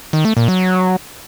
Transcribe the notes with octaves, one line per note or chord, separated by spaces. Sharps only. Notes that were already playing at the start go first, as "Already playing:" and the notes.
D#3
A3
A#2
F#3